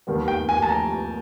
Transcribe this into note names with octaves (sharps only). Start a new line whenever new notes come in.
D#2 D#3 G3 B3
G5
G#5
A5
A#5